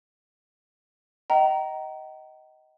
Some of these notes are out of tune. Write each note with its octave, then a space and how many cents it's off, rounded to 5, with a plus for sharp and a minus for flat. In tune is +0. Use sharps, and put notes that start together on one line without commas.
D#5 +15 G5 -40 A#5 +5